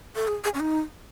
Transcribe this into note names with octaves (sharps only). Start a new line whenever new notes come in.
A4
G#4
G#4
C#4
D#4